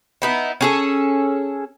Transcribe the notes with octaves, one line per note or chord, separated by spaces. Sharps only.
B3 D#4 E4
C#4 G#4 A4